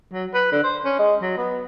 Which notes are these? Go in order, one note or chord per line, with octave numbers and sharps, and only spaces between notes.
F#3
B4
D3
C5
C#4
G#3
F#3
B3